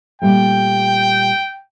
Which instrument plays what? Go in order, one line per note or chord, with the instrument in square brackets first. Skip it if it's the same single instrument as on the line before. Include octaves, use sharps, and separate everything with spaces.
[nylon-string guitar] A#2 G3 A3 [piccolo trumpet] G5